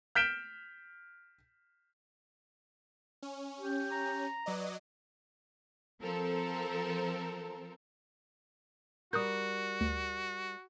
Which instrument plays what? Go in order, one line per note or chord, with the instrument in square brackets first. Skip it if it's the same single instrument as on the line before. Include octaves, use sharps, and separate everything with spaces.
[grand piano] F6 G6 B6 D7 E7 G7
[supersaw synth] C#4
[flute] G4
[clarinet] A#5
[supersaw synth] F#3 D5 D#5 [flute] B4
[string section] F3 C4 A4 A#4
[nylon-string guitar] G3 A#4 [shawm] F#4 [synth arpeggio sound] D#6 F#6 G6
[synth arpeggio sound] D2